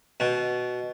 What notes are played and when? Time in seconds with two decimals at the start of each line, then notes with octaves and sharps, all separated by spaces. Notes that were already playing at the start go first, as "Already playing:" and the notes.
0.20 B2